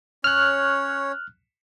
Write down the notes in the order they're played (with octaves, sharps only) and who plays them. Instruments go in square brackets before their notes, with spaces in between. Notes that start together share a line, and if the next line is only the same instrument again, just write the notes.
[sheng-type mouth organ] C#4 C#5 [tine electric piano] F6 F#6